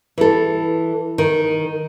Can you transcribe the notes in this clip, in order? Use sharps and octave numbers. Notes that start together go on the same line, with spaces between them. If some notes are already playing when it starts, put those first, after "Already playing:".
E3 A4
D#3